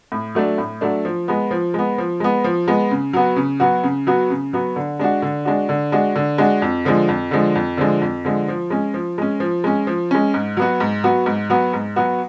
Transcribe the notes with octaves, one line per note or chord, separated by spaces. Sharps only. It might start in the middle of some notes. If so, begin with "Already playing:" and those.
A2
F#3 A3 D4
A2
F#3 A3 D4
F3
G#3 B3
F3
G#3 B3
F3
G#3 B3
F3
G#3 B3
C#3
F#3 B3 F#4
C#3
F#3 B3 F#4
C#3
F#3 B3 F#4
C#3
F#3 B3 F#4
D3
G#3 D4 F#4
D3
G#3 D4 F#4
D3
G#3 D4 F#4
D3
G#3 D4 F#4
F2
D3 F3 G#3
F2
D3 F3 G#3
F2
D3 F3 G#3
F2
D3 F3 G#3
F3
G#3 C#4
F3
G#3 C#4
F3
G#3 C#4
F3
G#3 C#4
G#2
F#3 B3 F#4
G#2
F#3 B3 F#4
G#2
F#3 B3 F#4
G#2
F#3 B3 F#4